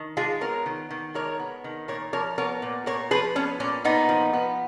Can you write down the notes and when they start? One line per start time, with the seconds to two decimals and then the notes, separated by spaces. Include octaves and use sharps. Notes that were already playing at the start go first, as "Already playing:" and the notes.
Already playing: D#3
0.17 G#3 F4 G#4
0.41 B3 A#4 C#5
0.66 D#3
0.91 D#3
1.15 G#3 A#4 C#5
1.39 B3
1.64 D#3
1.88 A#2 A#4 C#5
2.13 F3 A#4 C#5
2.38 B3 A#4 C#5
2.62 A#2
2.86 A#2 A#4 C#5
3.11 F3 G#4 B4
3.36 B3 C#4
3.60 A#2 C#4
3.84 A#2 B3 D#4
4.09 F3
4.33 B3